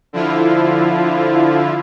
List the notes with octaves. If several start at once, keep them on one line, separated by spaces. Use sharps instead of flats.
D3 F3 E4 F4